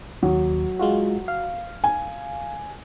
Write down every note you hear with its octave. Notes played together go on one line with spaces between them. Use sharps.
D#2 F#3
G#3 F4 F#4
F5
G#5